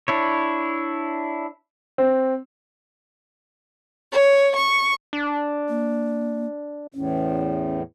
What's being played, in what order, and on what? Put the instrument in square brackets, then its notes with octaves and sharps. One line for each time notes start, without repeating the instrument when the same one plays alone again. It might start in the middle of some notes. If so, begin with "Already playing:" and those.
[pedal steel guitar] D4 E4 C#5
[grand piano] C4
[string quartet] C#5
C#6
[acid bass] D4
[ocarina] A#3
[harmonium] E2 A2 [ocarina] C#4